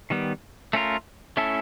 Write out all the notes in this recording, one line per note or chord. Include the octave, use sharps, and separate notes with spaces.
D#3 G3 B3
A3 C#4 F4 A#4
A3 C#4 E4 A4